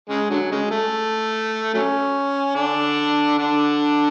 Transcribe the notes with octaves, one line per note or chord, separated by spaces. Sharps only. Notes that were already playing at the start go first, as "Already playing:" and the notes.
C#3 G#3
D3 F#3
C#3 G#3
A3
F#3 A3 C#4
D3 D4
D3 D4